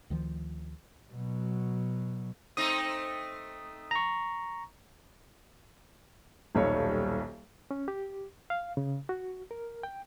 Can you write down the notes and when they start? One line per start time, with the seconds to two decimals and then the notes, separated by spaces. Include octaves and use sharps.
0.10 D2 D#3 F3
1.11 B2 F#3
2.57 A3 C4 D#4 D#6
3.91 A#5 C#6
6.55 D#1 B1 G3 A4 C#5
7.71 C#4
7.88 G4
8.50 F5
8.77 C#3
9.09 F#4
9.51 A#4
9.83 G5